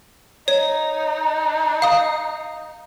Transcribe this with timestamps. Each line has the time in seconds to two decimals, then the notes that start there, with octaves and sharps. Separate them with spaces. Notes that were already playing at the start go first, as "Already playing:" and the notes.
0.48 D#4 C#5
1.82 F5 D#6